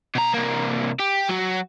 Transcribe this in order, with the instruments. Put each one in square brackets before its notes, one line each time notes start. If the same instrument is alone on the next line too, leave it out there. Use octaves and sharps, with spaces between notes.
[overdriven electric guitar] B2 A#5
C2 A#3
G4
F#3 F#4